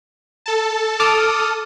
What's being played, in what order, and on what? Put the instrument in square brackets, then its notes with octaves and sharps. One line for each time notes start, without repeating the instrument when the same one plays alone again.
[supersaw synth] A4 A5
[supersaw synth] A4 D#6 [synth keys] A5 D6 F6